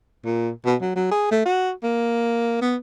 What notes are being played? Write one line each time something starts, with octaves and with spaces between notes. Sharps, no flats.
A#2
B2
F#3
F#3
G#4
A3
F#4
A#3
B3